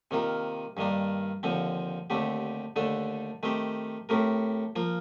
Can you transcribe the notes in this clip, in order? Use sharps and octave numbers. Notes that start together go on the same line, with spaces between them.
C3 D#3 A#3 F4
G2 D#3 A#3 D4
D#2 D3 F3 C4
D#2 D3 A3 C4 G4
D#2 D3 A3 D4 A4
D#3 A3 C4 G4 C5
A2 A3 C4 G4 A#4
F3 A#3 F4